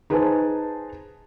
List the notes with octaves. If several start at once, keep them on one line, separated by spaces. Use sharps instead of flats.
D#4 G#4 B4 C5 G#5 A5